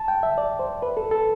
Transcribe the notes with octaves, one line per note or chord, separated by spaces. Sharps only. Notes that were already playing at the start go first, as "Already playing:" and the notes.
Already playing: A5
G5
E5
D5
C5
B4
A4
A4